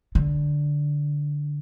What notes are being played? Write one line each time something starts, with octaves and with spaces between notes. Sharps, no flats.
D3